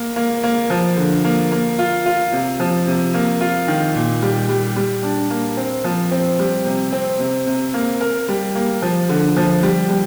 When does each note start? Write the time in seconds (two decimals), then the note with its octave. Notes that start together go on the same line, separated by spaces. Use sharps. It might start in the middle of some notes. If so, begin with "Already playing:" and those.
Already playing: A#3
0.16 A#3
0.43 A#3
0.70 F3
0.97 D3
1.24 A#3
1.52 A#3
1.79 F4
2.06 F4
2.33 C3
2.60 F3
2.87 C3
3.14 A#3
3.41 F4
3.68 D#3
3.95 A#2
4.22 G3
4.49 G3
4.76 G3
5.03 D4
5.30 A#3
5.57 C4
5.84 F3
6.11 C4
6.39 G3
6.66 C3
6.93 C4
7.19 C3
7.46 C3
7.74 A#3
8.01 A#4
8.28 G3
8.55 A#3
8.82 F3
9.09 D3
9.37 F3
9.63 G3
9.90 G3